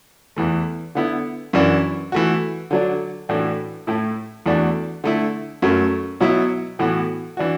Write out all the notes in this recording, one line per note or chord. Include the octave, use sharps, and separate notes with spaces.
E2 E3 A3
D3 B3 E4
F#2 E3 D4 F#4
E3 A3 F#4
D3 F#3 D4
A2 E3 D4 F#4
A2 A3 E4
E2 E3 A3 D4 F#4
D3 A3 E4
F#2 F#3 A3
B2 F#3 B3 E4
A2 E3 B3 F#4
E3 D4 F#4